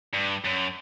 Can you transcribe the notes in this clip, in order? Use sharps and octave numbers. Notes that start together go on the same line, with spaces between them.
G2
F#2